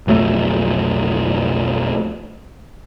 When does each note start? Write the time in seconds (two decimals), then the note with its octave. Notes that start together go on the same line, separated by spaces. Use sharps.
0.07 B1 F2 F#3 A3